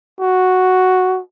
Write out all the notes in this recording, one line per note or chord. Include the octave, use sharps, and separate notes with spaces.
F#4